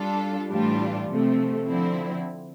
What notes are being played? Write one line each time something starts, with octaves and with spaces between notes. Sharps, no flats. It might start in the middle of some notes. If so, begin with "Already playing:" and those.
Already playing: G3 D4 F4 A4
A2 E3 G3 D4 F4
C3 F3 A3
D3 F3 C4 E4